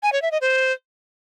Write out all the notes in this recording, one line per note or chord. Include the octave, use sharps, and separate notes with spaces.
G#5
C#5
E5
D#5
C5